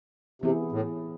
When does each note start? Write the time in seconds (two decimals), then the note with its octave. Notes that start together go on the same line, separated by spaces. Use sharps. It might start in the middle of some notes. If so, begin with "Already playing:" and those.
0.42 C3 E3 B3 E4 G#4
0.72 A2